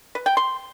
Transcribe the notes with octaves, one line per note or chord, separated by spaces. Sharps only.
B4
G5
C6